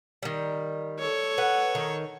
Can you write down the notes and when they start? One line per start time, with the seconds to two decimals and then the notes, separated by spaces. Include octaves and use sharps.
0.23 D#3 G3
0.99 A4 C#5
1.38 B4 F#5
1.75 D#3